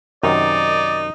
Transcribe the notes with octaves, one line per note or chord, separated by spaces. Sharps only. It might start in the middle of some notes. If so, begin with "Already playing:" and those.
F#2 C3 D#3 D#4 D5